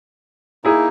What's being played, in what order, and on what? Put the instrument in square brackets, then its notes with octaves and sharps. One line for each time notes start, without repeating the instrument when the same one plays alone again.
[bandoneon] A#3 D#4 [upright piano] E4 G#4